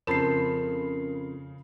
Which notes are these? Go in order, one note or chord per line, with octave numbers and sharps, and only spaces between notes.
F2 C#3 A#4 C5 A5 B5 C7 E7